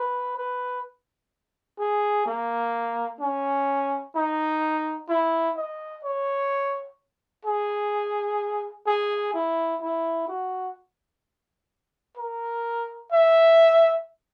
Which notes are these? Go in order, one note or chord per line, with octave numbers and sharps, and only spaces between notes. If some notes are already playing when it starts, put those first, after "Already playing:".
Already playing: B4
B4
G#4
A#3
C#4
D#4
E4
D#5
C#5
G#4
G#4
E4
E4
F#4
A#4
E5